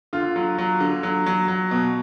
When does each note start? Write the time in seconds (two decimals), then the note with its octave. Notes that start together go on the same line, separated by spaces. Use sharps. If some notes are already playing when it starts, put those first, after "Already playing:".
0.13 D3 F4
0.36 F#3
0.58 F#3
0.80 D3
1.03 F#3
1.26 F#3
1.48 F#3
1.71 B2